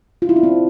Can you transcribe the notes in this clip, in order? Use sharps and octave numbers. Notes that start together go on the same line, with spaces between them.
F4
E4
D4
C4